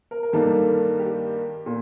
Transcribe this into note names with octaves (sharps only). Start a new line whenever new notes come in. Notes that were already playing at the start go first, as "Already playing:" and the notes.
A#4
A#4
G2 D#3 G3 A#3 A4
G4
A#2